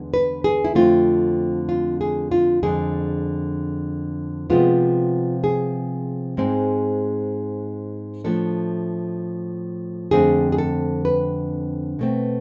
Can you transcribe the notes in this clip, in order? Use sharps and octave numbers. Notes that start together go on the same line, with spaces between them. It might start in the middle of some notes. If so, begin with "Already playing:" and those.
Already playing: E2 D3 G#3 B3
B4
G#4
E4
F2 D3 A3 C4 F4
F4
G#4
F4
F2 D3 G#3 D4 G#4
C3 F3 G#3 B3 F4
G#4
G#2 G#3 C4
A2 F3 A3 D4 A4
F2 D3 A3 C4 G#4
G#4
A4
B4
B2 A3 C4